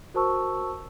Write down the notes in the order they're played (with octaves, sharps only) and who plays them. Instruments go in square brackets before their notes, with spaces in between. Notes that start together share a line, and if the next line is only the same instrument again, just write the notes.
[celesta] F#4 A#4 C5 A5 C#6 E6